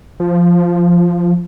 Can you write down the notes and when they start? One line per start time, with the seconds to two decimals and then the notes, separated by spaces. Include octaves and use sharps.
0.20 F3